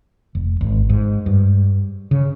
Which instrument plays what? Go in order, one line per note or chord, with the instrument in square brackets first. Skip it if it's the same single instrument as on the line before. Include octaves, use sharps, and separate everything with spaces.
[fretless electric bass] F1
G#1
G#2
G2
C#3